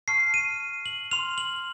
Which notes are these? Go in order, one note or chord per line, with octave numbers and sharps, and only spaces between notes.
A5 C#6 F6 C7
D#7
F#7
C6 F6 F7
F#7